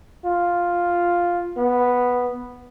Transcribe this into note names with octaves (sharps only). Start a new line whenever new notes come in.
F4
B3